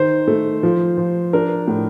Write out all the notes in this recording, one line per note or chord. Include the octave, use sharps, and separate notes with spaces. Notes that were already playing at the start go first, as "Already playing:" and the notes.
Already playing: D#3 C5
A3
F3
F3
D4 A#4
A2